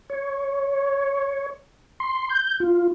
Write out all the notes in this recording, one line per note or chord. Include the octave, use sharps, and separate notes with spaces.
C#5
C6
G6
F4